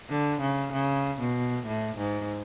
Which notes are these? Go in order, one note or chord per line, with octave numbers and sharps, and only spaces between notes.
D3
C#3
C#3
B2
A2
G#2